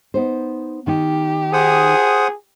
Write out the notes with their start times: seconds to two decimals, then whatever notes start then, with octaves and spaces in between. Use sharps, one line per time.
0.14 B3 D#4 C5
0.87 D#3 D#4 G4
1.53 G#4 C5 F#5 D#6